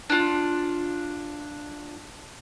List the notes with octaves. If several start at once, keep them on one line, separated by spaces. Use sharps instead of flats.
D4 F4